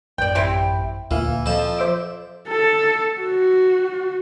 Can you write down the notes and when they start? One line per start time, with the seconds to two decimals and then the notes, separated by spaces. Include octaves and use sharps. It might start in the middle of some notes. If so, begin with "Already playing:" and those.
0.18 A1 F#2 D5 G5
0.35 C4 E4 G4
1.11 D2 A#2 E3 F5
1.46 F2 F3 A5
1.79 C5 E5 D6
2.49 A4
3.21 F#4